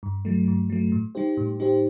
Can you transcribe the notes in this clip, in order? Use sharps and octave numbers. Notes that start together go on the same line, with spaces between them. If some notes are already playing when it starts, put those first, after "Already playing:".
G2
F#3 A3
G2
F#3 A3
A2
G3 D#4 G4 C5
A2
G3 D#4 G4 C5